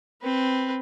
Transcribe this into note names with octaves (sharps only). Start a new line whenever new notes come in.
C4 B4